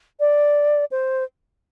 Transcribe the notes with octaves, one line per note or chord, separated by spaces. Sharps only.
D5
C5